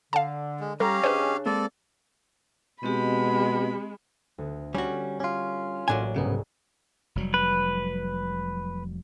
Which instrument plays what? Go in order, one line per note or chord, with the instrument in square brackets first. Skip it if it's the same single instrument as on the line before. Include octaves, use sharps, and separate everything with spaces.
[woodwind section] D3 [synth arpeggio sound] F5 A5
[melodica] G#3
[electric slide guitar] G3 [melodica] C#4 G4 F5 [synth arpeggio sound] A4 [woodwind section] A#5
[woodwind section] C#3 D4 [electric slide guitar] G#4 D#5 [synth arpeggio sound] B4 C5
[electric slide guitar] G#3 A#3 C4 [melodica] A4 D5
[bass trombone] B2 [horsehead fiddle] G#3 [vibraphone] C4 G4 [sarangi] B5
[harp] D2 B3
[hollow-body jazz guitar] G3 F#4 [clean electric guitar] C#4 [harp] C#6
[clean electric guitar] C#4 F4 [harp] D6
[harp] A1 A2 A#3 [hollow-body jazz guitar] F#3 D4 G#5
[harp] C2 G#2 G#4 [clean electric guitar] C#3 B3
[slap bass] F1 F#3 G3
[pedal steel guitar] B4